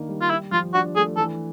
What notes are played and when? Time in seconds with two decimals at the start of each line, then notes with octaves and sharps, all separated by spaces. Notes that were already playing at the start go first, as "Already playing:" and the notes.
Already playing: D#3 A#3 D4
0.08 G3
0.21 F4
0.30 E4 G4
0.52 F3 F4
0.74 D4 F#4
0.96 A3 G#4
1.17 E3 A4